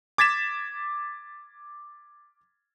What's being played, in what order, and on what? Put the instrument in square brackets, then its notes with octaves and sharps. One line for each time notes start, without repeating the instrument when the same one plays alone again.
[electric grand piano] D6 G#6 A6 B6 E7